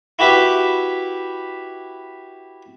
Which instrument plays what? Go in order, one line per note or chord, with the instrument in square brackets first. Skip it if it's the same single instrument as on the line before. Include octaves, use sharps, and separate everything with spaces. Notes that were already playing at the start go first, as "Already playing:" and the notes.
[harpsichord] E4 F#4 G4 B4 E5